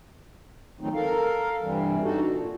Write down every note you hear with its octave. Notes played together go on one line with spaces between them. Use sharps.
D#3 F3 F#3 A3 C4 D#4
A4 A#4 F5
G2 C3 E3 G3
D4 D#4 F#4 A4
A#2